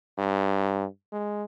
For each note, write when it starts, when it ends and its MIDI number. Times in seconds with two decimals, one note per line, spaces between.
0.18 0.85 43
1.12 1.44 56